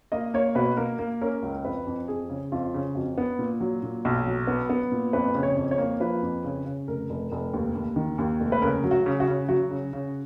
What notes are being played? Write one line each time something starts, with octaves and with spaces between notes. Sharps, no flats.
A#3 D#5
A#3 C#5
B2 B4
A#3 A#4
A#3
C#4 A#4
C#2
F2 B4
F2
F2 G#4
C#3
F2 F4
C#3
F2 F#4
B3
A#2
F#3
A#2
B1
F#3
B3
B3
A#2
F2 B4
C#3
C#5
F2
C#5
A#3
F3 B4
F2
C#3
C#3
F1 A#4
F1
F1
D#2
D#2
D#3
D#2
F1
B4
C#3 A#4
F#3
F#4
C#3
F#4
C#3
F#3 F#4
C#3
C#3